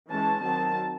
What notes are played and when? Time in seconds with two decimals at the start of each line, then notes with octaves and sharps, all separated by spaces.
0.10 E3 G#3 C#4 A5
0.43 D#3 F#3 C4 A5